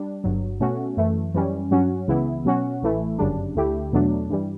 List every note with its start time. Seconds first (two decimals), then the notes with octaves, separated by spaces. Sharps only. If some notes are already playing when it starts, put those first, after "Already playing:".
Already playing: G3 D4
0.24 G1 G2 F#3
0.60 B2 A3 C#4 F#4
0.97 F#2 E3 A3
1.34 F#2 E3 G3 C#4
1.71 G2 F#3 C#4 F#4
2.08 C#2 C#3 E3 B3 E4
2.45 B2 F#3 C#4 F#4
2.82 A1 A2 E3 A3 E4
3.19 G1 F#2 C#3 G3 D4
3.56 D2 D3 A3 E4 G4
3.92 E2 B2 F#3 A3 D4
4.29 G2 E3 G3